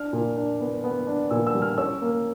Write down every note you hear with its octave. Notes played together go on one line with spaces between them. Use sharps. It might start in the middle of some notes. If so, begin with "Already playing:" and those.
Already playing: D4 F6
A#2
D4
B3
B3
D4
A#2 E6
E6
G3
F6
C#4 E6
A#3